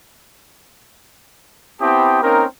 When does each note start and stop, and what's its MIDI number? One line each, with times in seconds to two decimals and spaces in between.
1.81 2.19 59
1.81 2.19 60
1.81 2.19 64
1.81 2.19 67
1.81 2.19 81
1.81 2.19 87
2.22 2.45 58
2.22 2.45 60
2.22 2.45 61
2.22 2.45 63
2.22 2.45 70